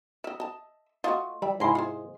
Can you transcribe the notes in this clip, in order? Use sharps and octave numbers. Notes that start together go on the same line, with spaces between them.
A#4 D#5 E5
D#5 A5
A3 F4 F#4 D#5
G3 E5 B5
G#2 C3 G#3 E4 C6
F4 G#4 C5